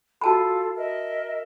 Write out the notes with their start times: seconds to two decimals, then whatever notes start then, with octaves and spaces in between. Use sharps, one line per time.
0.21 F4 F#4 A4 A5 B5
0.76 A#4 D#5 E5